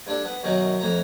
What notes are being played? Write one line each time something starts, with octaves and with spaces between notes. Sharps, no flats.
G2 D4 A4
B3
F#2 B2 D#3 F#3
F2 A2 A#5